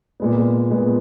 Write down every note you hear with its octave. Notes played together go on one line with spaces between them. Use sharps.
A#2 G#3 B3
A#2 G#3 B3